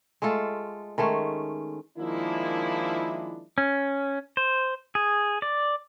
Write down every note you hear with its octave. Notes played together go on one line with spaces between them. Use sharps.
G#3 A3 F4 A4
D#3 G#3 A3 C#4
D#3 F3 G#3 A#3 D4 E4
C#4
C5
G#4
D5